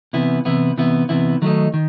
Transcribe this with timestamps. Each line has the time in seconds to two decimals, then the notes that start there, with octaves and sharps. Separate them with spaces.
0.13 C3 E3 B3 E4
0.45 C3 E3 B3 E4
0.77 C3 E3 B3 E4
1.09 C3 E3 B3 E4
1.42 D#3 F#3 A3 D#4
1.74 D#3